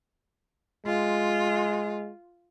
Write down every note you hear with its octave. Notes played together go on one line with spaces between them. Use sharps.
G#3 F4